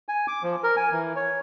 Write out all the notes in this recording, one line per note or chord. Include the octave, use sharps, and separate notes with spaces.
G#5
D6
F3
A#4
G#5
E3
C#5